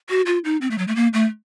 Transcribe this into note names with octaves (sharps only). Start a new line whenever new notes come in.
F#4
F4
D#4
C4
A3
F#3
A3
A#3
A3